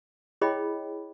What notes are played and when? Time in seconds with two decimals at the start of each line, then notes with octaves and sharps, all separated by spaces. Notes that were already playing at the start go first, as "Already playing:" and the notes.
0.41 E4 G#4 C#5 D#5 G5 B5